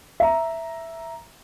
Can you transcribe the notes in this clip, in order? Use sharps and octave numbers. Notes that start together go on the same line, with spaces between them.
E5 A#5